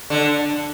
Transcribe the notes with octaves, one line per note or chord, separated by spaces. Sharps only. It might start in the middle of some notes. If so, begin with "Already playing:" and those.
D3